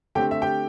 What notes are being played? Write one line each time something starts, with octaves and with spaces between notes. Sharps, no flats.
D3 A3 C4 G4 G5
E5
G4 G5